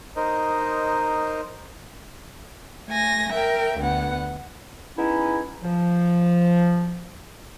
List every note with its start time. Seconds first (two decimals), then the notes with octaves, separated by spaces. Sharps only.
0.16 D#4 A#4 C5 D#5
2.88 A3 G#5 A#6
3.32 A#4 E5 G5
3.78 D2 B3 F#5
4.97 G#3 B3 C#4 D#4 E4
5.63 F3